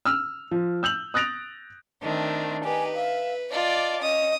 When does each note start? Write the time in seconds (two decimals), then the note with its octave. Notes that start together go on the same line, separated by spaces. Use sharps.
0.05 E6 F6
0.51 F3
0.83 E6 G6 F7 F#7
1.14 D#6 F#6 A6 A#6 D7 F7
2.02 D#3 A3 C4 D4
2.64 D#4 G4 B4 G#5
2.95 E5 F5
3.52 F4 D5 D#5 A5 D6
4.02 C#4 D#5 D#6